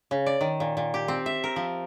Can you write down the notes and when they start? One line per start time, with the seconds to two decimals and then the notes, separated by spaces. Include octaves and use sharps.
0.11 C#3
0.26 D5
0.41 D#3
0.60 A#2
0.77 A#2
0.94 G4
1.08 C4
1.26 E5
1.44 A#4
1.56 F3